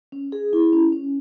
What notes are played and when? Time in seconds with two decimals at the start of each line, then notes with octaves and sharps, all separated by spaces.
0.12 C#4
0.32 G#4
0.53 E4
0.73 C#4
0.92 C#4